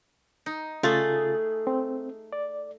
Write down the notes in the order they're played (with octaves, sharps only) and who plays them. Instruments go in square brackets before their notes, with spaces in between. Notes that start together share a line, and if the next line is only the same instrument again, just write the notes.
[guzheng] D#4
[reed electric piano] C#3 F4 A6 [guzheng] A3 G#4
[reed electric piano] C4
D5